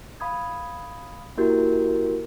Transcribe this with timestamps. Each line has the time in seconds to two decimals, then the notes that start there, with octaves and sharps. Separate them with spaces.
0.20 F5 B5 D#6 G#6
1.37 A#3 E4 F#4 G4 A#4 G6